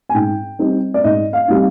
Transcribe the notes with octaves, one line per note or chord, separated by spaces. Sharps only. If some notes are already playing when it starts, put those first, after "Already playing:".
G#5
G#2 G5
G3 C4 D#4
D5
G#2 D#5
F5
G3 C4 D#4 F5